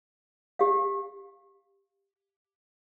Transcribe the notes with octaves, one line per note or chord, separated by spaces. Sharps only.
G4 F5